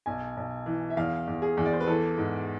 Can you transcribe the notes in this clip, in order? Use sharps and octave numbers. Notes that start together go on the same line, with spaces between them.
B1 G#5
B1
E3
E5
E2 F5
E2
G#4
E2
D5
C5
B4
E3 A4
G#2